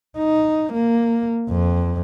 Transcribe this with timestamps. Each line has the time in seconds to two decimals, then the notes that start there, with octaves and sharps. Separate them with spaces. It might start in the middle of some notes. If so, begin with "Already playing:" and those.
0.18 D#4
0.73 A#3
1.49 F2